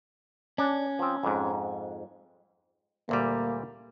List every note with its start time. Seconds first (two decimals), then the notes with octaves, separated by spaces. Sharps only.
0.58 C#4 D4
0.99 F3 C4
1.23 F2 G#2
3.09 D2 A#2 G3 A#3